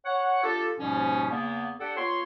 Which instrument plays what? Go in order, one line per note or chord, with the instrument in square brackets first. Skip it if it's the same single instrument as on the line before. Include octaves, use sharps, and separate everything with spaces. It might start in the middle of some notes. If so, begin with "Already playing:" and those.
[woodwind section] C#5 F#5
D4 F4 G4 A4
D#2 G#2 B2 F3 G3 C#4
E2 C#3 A#3 B3
D4 G4 A4 D5 F#5
B3 F4 C#5 C6